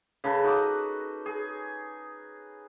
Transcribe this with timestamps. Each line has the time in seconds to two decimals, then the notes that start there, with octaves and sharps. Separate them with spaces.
0.24 C#3 A4 B4
0.44 D#4 F#4 D#5 D6
1.26 G#4